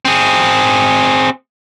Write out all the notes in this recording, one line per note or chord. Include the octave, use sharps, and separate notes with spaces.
C4 G#4